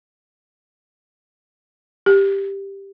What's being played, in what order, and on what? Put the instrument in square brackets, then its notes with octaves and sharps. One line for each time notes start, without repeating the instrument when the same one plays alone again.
[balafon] G4